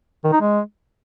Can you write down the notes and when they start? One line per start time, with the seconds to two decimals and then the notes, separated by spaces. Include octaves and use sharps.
0.24 D#3
0.32 D#4
0.40 G#3